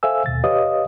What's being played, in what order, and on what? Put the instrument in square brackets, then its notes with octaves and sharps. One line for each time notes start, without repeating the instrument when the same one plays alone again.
[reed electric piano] A4 C5 E5 F5 G#5 E6
D#2 B2 A6
G4 B4 C#5 D#5 F5 D#6